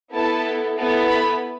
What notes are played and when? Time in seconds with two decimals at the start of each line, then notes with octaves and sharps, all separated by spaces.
0.12 B3 E4 A4 A5
0.78 B3 E4 A4
1.11 B5